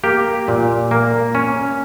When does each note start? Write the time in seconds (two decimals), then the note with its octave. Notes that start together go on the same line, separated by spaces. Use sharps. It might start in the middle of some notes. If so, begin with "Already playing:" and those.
0.04 A#3 G4
0.48 A#2
0.91 A#3
1.35 C#4